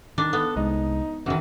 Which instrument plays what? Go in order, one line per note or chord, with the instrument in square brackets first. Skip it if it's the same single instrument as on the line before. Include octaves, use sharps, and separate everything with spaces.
[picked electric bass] D#3 [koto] D4
[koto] B3 [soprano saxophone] A4
[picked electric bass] C2 G#3 [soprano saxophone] D#4
[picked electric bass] F1 C#4 [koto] D#3 E3 [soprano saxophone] F#4